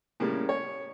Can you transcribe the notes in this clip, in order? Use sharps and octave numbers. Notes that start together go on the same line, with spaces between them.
A2 C#3 G3 A#3
C#5